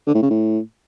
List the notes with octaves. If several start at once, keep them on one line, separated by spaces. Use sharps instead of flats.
D3
A2
C#3
A2